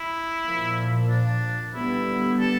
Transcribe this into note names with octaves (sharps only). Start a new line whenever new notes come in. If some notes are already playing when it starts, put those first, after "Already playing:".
Already playing: E4
A#2 F3 A#3
D4
D3 G3 B3 E4
A4